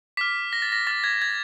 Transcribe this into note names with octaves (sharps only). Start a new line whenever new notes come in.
D6 F6 B6
A#6
A6
A#6
D6 F6 A6
G#6
G#6